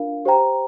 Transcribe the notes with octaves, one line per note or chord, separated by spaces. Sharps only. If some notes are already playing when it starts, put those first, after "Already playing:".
Already playing: D4 F4 A#4 F5
G4 C5 G5 A#5